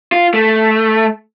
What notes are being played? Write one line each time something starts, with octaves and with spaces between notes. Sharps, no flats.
F4
A3